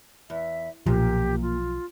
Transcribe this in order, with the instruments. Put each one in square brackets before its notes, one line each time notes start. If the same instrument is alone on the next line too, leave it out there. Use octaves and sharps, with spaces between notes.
[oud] E2 [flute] E5
[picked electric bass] B1 F3 [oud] A#2 [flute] G4
[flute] F4